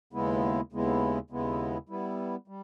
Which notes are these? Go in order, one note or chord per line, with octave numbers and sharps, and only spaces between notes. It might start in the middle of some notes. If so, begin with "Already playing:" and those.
D#2 C#3 G#3 B3 E4
D#2 C#3 G#3 B3 E4
D#2 C#3 G#3 B3 E4
G3 B3 E4
G3